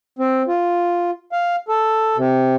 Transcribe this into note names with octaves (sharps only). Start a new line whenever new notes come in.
C4
F4
F5
A4
C3